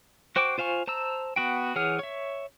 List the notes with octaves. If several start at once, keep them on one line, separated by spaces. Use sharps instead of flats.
F#4 C5 G5 C#6 D6
F4 C5 F5 G#5 C#6
C5 A5 A#5 E6
B3 F#4 G5
E3 G#4 C#5 F#5 F6
C#5 E5